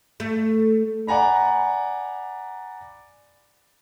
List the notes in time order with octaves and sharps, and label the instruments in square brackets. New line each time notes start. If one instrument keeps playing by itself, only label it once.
[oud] A3
[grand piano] D5 F#5 G#5 A#5 B5